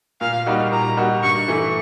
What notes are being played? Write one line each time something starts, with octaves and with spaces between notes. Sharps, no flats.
A#2 F5
G3 A#3 D#4 F#4
A#2 A#5
G3 A#3 D#4 F#4
G2 C#6
E3 A3